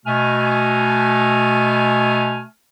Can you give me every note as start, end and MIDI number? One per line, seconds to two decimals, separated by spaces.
0.06 2.44 47
0.06 2.44 57
0.06 2.44 80
0.06 2.44 89